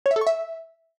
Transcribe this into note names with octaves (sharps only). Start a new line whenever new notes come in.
C#5
E5
A4
C#6
E5